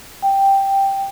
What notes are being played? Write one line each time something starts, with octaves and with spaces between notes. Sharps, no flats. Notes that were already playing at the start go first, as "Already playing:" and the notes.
G5